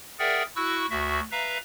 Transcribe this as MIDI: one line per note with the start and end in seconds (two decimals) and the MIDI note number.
0.19 0.43 68
0.19 0.43 70
0.19 0.43 74
0.19 0.43 76
0.19 0.43 78
0.19 0.43 79
0.56 0.86 64
0.56 0.86 66
0.56 0.86 85
0.56 0.86 88
0.56 0.86 90
0.90 1.20 38
0.90 1.20 66
0.90 1.20 76
1.31 1.58 71
1.31 1.58 76
1.31 1.58 77
1.31 1.58 82